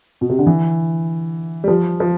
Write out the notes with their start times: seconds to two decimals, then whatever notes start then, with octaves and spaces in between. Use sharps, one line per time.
0.21 B2
0.30 C3
0.39 D3
0.47 E3
1.64 G3
1.68 F3
2.00 F3